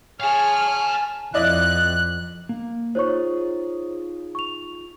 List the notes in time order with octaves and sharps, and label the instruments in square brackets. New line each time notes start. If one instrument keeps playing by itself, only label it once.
[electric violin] G#4 C#5 [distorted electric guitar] F5 A5 [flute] G#5 [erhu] F6
[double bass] F2 [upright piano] E4 D5 D#5 [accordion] F#6
[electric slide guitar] A#3
[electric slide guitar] D#4 F4 G#4 [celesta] C5 C#5 C#6
[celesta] C#6 F7